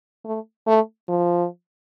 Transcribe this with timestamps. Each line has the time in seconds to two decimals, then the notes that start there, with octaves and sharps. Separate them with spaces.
0.25 A3
0.67 A3
1.09 F3